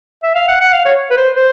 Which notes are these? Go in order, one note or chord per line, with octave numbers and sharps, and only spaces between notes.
E5
F5
F#5
F#5
F5
C#5
B4
C5
C5